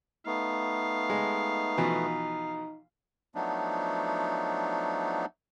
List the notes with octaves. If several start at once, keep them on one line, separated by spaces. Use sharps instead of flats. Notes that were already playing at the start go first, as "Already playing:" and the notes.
A3 B3 D#4 F5
G#3
B2 E3 F3
F3 F#3 A3 B3 D4 D#4